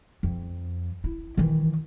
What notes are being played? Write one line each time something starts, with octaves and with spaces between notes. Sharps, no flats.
F2
E4
D#3 E3